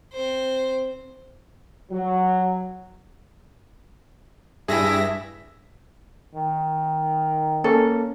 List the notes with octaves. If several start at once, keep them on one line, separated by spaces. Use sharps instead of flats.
C4 C5
F#3
G2 E4 G#4 E5 A#6
D#3
A#3 C#4 A4